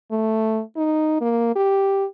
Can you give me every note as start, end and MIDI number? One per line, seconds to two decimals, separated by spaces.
0.11 0.62 57
0.76 1.16 63
1.21 1.52 58
1.55 2.05 67